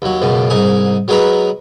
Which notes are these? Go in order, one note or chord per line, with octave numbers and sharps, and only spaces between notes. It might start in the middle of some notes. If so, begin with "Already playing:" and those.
D#2 F#3
C#2 F#2 B2
C2 G#2 D#4 G#5
F#3 G#3 B3 A#4 B4